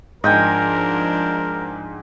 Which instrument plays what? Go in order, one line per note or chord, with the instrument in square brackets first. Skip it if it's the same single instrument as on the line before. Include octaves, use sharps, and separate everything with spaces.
[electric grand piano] G#2 [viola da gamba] F3 D4 [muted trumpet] A#4 [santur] D#5 G5 G#5